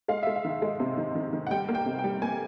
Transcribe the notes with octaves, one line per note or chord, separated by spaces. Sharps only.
G#3 F5
G#3 E5
F5
D#3
G#3
C3
D#3
D#3
D#3
F#5
G3 G5
A#3
G5
C3
G5
G3
A#3 G#5